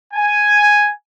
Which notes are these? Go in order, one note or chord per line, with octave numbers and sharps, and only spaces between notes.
G#5